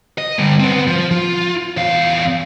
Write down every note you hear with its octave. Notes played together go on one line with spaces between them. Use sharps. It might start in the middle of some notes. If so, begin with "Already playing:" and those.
D#5
D3 G3
B3 C4
F3
F4
E2 F5